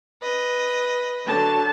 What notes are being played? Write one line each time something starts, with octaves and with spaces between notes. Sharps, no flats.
B4 D#5
D3 F#3 A5